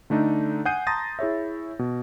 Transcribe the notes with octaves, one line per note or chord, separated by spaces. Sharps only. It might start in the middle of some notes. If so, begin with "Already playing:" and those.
D3 A3 D4 D#4
F#5 G#5 D#6 G6 C7 D#7
A5 A#5 C6 D#6 A6 A#6
E4 G#4 C#5 E5
B2